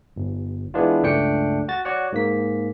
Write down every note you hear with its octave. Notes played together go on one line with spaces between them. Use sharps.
G1
E3 G#3 B3 D4 E4 F4
C#2 G2 A3 D4 G5 C#7
F#4 A6
F#4 C#5 D5 F#5
G#2 A#3 B6